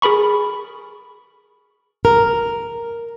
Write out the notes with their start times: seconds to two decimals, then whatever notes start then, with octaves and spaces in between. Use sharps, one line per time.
0.02 G#4 A#4 B5 C#6
2.05 A#4